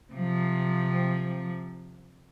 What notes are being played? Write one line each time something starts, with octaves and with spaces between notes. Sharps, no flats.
C3 F3